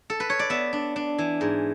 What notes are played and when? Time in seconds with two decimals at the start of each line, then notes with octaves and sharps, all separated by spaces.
0.10 A4
0.20 B4
0.30 C#5
0.39 D5
0.50 B3 E5
0.73 D4
0.96 D4
1.18 E3
1.41 G#2